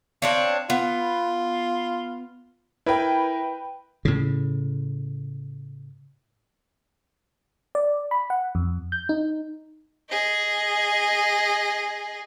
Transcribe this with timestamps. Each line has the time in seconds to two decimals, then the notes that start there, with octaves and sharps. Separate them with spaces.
0.22 C4 D4 C#5 F5
0.70 B3 F4
2.86 E4 A#4 B4 G5
4.05 A2 C#3
7.75 D5
8.11 B5
8.30 F#5
8.55 F2
8.92 G6
9.09 D#4
10.10 G#4 D#5